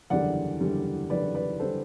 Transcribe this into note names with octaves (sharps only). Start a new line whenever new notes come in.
F#1 E2 D3 G3 D5 F#5
F#1 E2 D3 G3
F#1 E2 D3 G3 B4 D5
B4 D5
D3 G3 A4 C5